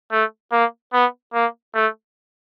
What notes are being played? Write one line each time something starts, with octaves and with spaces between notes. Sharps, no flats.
A3
A#3
B3
A#3
A3